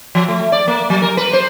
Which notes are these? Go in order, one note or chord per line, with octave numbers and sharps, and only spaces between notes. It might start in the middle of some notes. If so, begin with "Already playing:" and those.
F3
A3
D5
A#3
F#3
A#4
B4
C5